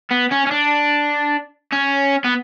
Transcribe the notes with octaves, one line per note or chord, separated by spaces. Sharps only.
B3
C#4
C#4
D4
C#4
B3